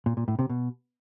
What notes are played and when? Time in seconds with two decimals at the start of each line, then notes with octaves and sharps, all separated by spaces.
0.06 A#2
0.17 A#2
0.28 A2
0.39 C3
0.50 B2